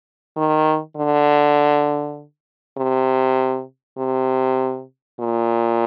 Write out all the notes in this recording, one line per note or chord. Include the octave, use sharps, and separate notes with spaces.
D#3
D3
C3
C3
A#2